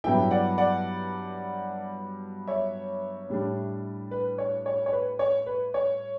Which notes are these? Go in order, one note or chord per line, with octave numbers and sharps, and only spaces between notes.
G2 F#3 B3 E4 E5 G5
D5 F#5
D5 F#5
C#5 E5
A2 G3 D4
B4
C#5
C#5
C#5
B4
C#5
B4
C#5